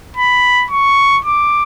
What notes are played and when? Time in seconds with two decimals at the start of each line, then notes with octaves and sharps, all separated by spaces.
0.17 B5
0.71 C#6
1.25 D6